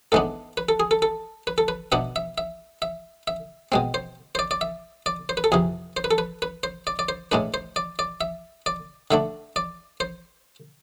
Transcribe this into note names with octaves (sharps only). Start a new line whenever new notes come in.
G#2 E3 G#3 B3 D4 A4
B4
A4
G#4
A4
A4
B4
A4
B4
B2 B3 D4 E5
E5
E5
E5
E5
B2 G#3 C4
C5
C5
D5
D5
E5
D5
C5
B4
A4
F2 C3 E3 G#4
C5
B4
A4
B4
B4
C5
D5
D5
C5
A2 G#3 D4 B4
C5
D5
D5
E5
D5
D3 A3 D4 E5
D5
C5